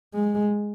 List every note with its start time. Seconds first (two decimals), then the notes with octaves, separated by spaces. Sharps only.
0.15 G#3